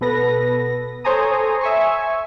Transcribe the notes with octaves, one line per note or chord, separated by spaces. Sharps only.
B2 B3 A4 B4 A#6
A4 C5 C#5 G#5 A#5 D#6
E5 G#5 C#6